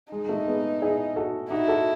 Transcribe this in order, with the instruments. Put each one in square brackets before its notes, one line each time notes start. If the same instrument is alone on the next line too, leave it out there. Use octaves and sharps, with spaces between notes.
[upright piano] G#3 [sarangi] D#4
[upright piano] G#3
A3
G#3 B3
E4 G#4
F#4 A4
[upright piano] D#4 F#4 [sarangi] E4
[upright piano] F#4 A4